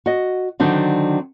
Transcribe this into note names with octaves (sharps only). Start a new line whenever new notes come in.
F#4 D#5
D3 D#3 F#3 C4 D4